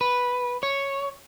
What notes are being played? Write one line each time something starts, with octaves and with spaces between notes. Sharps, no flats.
B4
C#5